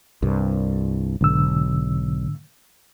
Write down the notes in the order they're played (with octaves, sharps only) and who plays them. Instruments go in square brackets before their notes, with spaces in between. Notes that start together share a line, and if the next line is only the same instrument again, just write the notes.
[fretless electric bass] C2 G2
[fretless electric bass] B1 [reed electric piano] G#2 D3 E6